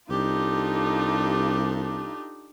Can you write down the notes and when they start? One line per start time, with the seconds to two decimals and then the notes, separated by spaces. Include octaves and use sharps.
0.10 C2 D4 D#4 F4 G4 A4